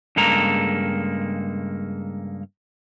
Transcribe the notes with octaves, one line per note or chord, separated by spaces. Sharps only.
G2 C#3 G#3 A#3 A4 A#5